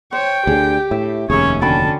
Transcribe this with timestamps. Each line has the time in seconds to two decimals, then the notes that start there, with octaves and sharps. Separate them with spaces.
0.13 C5 C#5 G5
0.47 D2 D3 G4 G#4
0.91 A2 E5
1.30 F1 D#2 C#4 G#4 A#4 C#5 E5
1.62 D3 C#4 F#4 G5 A5 B5